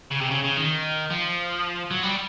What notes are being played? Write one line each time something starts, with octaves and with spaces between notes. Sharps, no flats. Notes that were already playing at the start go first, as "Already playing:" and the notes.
C#3
C3
C#3
C#3
D#3
F3
F#3
G3